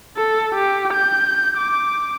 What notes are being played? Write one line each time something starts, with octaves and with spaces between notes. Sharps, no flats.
A4
G4
G6
D6